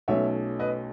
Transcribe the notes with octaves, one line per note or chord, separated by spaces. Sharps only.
B1 B2 A3 C#4 C#5 E5
B4 D#5